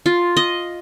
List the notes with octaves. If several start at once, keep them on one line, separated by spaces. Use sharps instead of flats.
F4
D#5